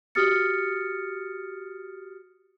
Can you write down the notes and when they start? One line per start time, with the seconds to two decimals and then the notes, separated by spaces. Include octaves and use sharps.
0.15 F#4 G4 D#6 F6 A6 C#7